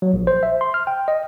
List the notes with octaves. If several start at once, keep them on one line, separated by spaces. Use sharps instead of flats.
F#3
A#1
C5
E5
C6
F6
G5
D#5